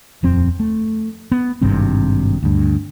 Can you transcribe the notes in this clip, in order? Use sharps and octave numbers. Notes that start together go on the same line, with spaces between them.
D#1 F2 C4
A3
B3
G#1 G2 C3 C4
D2 G2